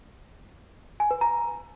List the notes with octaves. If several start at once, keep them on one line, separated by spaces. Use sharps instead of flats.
G#5
B4
A#5